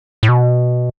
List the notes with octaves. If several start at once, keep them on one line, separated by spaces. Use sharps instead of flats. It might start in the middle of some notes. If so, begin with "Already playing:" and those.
A2
B2